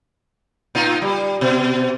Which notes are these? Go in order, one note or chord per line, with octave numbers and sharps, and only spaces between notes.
A#2 D#4 F4
G3
B2